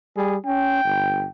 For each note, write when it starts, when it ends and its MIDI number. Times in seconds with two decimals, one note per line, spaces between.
0.17 0.37 55
0.17 0.37 68
0.46 0.82 61
0.46 1.29 79
0.85 1.26 31